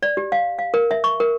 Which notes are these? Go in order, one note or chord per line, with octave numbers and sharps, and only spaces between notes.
D5
G4
F5
F5
A#4
E5
C#6
A#4